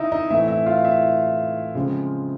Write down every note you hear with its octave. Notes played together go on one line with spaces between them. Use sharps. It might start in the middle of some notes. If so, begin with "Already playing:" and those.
Already playing: D3 D#4 E4 D#5 E5
D#4 D#5
A2 E3 A3 C4 E4 E5
E4 E5
F4 F5
E4 E5
C#3 F3 G#3 C4